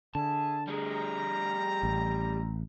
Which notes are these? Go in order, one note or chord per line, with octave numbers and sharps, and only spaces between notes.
D3 G#4 E5 G#5 A5
G3 C4 G#4 A#5
A1